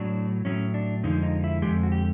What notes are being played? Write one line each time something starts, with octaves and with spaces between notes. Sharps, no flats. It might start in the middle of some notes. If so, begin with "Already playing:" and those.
Already playing: A2 F#3 D4
A2 F#3 C#4
D4
F2 D3 F3 G#3 D#4
D#4
E4
F2 D3 F3 G#3 G4
F#4
G4